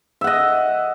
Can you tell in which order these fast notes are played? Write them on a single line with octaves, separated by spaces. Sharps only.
E5 F#5 D#5